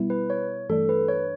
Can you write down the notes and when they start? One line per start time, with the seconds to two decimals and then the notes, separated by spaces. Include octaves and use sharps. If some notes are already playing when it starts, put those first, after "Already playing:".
Already playing: B2 G3 B3 E4
0.10 B4
0.30 C#5
0.70 G2 E3 A3 D4 A4
0.89 B4
1.08 C#5